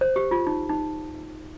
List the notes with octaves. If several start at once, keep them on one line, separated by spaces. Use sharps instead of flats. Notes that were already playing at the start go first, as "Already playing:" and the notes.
C5
G4
F4
D#4
D#4